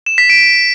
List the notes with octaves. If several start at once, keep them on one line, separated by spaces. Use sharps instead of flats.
E7
B6
D7